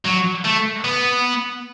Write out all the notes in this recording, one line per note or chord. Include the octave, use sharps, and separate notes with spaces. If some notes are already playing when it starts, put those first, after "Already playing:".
F#3
A3
B3